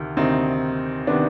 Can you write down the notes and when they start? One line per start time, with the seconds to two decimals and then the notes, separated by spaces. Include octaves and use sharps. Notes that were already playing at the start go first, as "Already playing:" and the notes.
Already playing: D2 C3 D#3
0.17 D2 C3 D#3 C4 D#4
1.07 C3 D#3 B3 D4